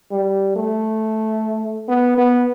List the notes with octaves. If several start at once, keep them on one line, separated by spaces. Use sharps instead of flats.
G3
A3
B3
B3